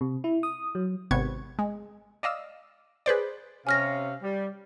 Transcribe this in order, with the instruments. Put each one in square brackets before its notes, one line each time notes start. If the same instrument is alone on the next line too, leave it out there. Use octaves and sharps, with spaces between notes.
[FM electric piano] C3
E4
D#6
F#3
[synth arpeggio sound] G#1 C3 B3 C#6 G#6
G#3
D5 D#5 F5 E6
G#4 B4 C5 D5
[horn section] C3 C#4 F5 [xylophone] G#5 F6 A#6
[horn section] G3